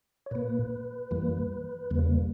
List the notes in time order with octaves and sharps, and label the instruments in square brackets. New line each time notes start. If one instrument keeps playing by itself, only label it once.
[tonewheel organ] C#5
A#2 A#3 B4
F#2 E3 G3 A#3
E2 C#3 G3 A#3